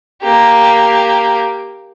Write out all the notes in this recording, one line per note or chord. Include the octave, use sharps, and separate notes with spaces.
A#3 G4